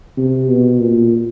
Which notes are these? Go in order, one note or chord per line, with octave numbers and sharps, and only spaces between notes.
C3
B2
A#2